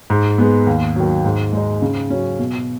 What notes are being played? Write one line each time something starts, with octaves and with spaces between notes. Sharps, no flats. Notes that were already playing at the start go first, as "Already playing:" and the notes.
G#2
G#3 B3
D#2
D#3 F#3
G#2
G#3 D#4
C#3
F#3 C#4
B2